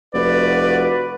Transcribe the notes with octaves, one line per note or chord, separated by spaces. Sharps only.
F1 F#4 B4 D5